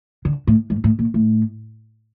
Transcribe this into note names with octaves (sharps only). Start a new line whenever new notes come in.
D3
A2
G#2
A2
A#2
A2